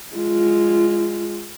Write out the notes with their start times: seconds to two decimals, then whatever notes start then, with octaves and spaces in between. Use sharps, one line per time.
0.15 G#3 F4